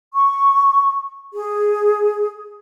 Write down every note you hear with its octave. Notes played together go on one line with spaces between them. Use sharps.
C#6
G#4